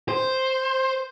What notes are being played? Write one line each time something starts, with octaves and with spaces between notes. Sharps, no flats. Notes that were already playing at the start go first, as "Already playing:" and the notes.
C5